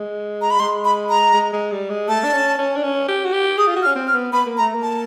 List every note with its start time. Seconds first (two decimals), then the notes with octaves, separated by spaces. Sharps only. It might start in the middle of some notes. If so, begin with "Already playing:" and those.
Already playing: G#3
0.42 A#5
0.50 B5
0.60 G#3 C6
0.85 B5
1.09 A#5
1.34 G#3
1.53 G#3
1.72 G3
1.90 G#3
2.08 A3 A5
2.24 D4
2.33 C#4
2.58 C#4
2.76 D4
2.83 C#4
3.08 G4
3.25 F#4
3.33 G4
3.58 G#4 D#6
3.67 F4
3.76 F#4
3.83 F6
3.86 C#4
3.96 C4
4.07 F6
4.14 B3
4.33 B3 B5
4.46 A#3
4.57 A#5
4.60 A3
4.75 A#3
4.82 A5